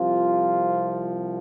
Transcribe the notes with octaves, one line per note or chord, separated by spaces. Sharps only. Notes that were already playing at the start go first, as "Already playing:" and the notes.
Already playing: C2 C3 F3 F4